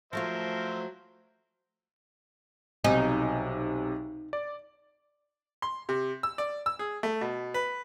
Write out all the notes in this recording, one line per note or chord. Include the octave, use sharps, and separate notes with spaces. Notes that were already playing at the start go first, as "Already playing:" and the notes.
F3 F#3 A3 F4 A#4 C5 E5
B1 C3 D#4 G#5
D5
C6
C3
E6
D5
E6
G#4
A3
B2
B4